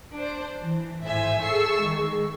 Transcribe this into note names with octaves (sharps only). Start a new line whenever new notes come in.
D4 C5
E3
G#1 A2 C5 E5 G#5
G#4 A4 C#6 E6 C7
D#3 G#3